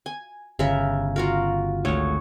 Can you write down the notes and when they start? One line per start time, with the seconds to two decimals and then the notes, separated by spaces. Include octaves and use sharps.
0.06 G#5
0.59 G1 C#3 A#4 E5
1.16 F4 F#4 A#4
1.85 G#1 D2 C#5